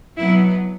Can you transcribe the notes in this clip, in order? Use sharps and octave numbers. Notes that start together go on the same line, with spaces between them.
B2 F#3 B3 E4